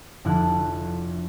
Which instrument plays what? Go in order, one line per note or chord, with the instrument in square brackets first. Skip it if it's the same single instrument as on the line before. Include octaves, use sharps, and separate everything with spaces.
[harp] F1 D3 E4 A5 F6 F#6